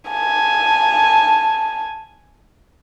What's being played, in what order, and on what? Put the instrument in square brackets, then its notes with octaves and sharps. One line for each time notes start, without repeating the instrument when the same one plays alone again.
[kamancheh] G#5 A5